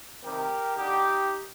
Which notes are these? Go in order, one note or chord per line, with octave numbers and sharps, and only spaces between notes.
C3 D#3 G3 G4 A#4
D3 G3 D#4 G4